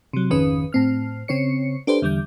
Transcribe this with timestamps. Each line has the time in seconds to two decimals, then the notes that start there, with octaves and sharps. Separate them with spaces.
0.13 C3 F#3
0.30 G#1 F2 D#3 C#4 B4 D#6
0.73 A2 C4 F6
1.28 C#3 C4 C#5 C#7
1.87 D4 G4 A4 B4 C5
2.02 E2 D3 G3 D6 G6